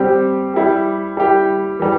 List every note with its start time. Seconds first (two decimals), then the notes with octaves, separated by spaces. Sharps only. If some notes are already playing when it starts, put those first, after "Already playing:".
Already playing: G3 C4 G4
0.54 G3 E4 G4
1.17 G3 E4 G4
1.79 E3 G3